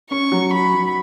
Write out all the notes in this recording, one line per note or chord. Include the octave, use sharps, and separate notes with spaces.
C#4 C#6
F#3
F#4 B5
F#3